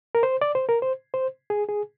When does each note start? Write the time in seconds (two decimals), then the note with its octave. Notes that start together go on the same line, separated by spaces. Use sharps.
0.15 A#4
0.23 C5
0.41 D5
0.55 C5
0.69 A#4
0.82 C5
1.14 C5
1.50 G#4
1.69 G#4